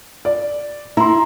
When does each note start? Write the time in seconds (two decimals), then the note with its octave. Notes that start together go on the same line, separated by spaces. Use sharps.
0.25 D5
0.97 E4 A#5 C6